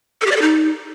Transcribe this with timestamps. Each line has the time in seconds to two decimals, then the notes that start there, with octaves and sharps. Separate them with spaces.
0.21 A4
0.26 G4
0.31 D5
0.36 A4
0.42 D#4